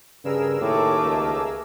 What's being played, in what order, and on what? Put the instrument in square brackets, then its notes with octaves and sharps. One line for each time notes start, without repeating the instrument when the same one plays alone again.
[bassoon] G2 [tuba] C#3 [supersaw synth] G#4 A#4 E6
[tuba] D#2 [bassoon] A2 [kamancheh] A3 D6
[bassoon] C#2